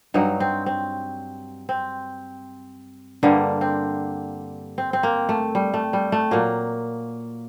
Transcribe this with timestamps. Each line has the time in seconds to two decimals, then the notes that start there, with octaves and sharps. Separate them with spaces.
0.14 G2 F#3 D#4
0.40 C4
0.66 C4
1.69 C4
3.23 G2 D3 G3 A#3
3.61 C4
4.78 C4
4.93 C4
5.03 A#3
5.29 A3
5.55 G3
5.74 A3
5.93 G3
6.12 A3
6.31 A#2 F#3 A#3